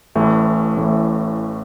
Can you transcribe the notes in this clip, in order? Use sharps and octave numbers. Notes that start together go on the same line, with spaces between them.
A1 A2 E3 A3
A1 A2 E3 A3